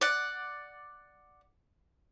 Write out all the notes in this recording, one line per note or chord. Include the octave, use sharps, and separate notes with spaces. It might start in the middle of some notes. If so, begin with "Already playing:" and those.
D5 F#5